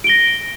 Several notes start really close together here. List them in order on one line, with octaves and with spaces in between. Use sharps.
D7 G7 A#6